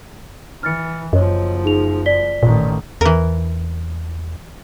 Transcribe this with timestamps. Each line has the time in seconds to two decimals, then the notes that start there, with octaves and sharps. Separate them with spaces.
0.63 E3 F6 A6 C#7
1.13 F#1 F#2 F3 C#5 D#5
1.64 D#4 G#4 F7
2.06 D5 B6 G7
2.43 A1 A#2 D#3
3.01 E2 E3 A#4